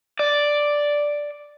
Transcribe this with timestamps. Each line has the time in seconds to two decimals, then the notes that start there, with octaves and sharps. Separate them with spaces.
0.19 D5